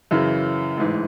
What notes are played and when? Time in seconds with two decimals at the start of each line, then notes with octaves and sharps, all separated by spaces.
0.11 F#2 C#3 E3
0.77 A1 G#2 E3